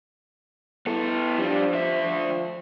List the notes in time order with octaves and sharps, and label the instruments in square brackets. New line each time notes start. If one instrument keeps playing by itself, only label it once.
[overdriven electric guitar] B3 A4 [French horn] E4
[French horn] F3 [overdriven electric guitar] G3 D4
[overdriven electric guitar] D3 E5
[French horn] F3